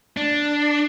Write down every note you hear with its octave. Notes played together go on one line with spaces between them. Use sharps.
D4